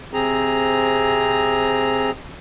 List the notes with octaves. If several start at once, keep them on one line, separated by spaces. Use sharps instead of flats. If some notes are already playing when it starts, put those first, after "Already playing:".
C3 C4 G#4 A#5